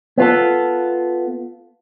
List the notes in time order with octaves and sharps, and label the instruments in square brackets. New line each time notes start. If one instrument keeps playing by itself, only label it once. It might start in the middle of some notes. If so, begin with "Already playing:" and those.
[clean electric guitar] B3 F4 A4